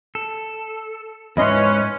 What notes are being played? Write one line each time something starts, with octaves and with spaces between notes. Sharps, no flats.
A4
F2 G#2 C#4 E4 B4 D#5 C6